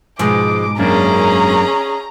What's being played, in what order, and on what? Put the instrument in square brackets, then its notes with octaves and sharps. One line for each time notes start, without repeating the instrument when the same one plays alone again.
[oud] G#2 B2 [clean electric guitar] F3 G#3 [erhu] D6
[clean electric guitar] F#2 A#3 D4 [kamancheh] C#4 G#4 [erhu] A#5